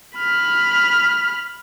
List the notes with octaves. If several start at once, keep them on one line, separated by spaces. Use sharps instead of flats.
B5 F6